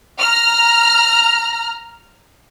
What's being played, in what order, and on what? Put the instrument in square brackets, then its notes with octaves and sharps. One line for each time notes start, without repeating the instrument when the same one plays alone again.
[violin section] A#5 F6